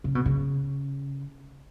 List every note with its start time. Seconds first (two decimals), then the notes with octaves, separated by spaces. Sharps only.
0.04 C#3
0.15 B2
0.26 C#3